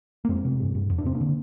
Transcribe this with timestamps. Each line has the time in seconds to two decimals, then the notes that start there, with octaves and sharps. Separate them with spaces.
0.25 A#3
0.29 F2 G#3 C4
0.45 C3
0.60 G2
0.75 G2
0.90 F2
0.98 D4
1.05 C3 C4
1.15 A#3 D4
1.21 D3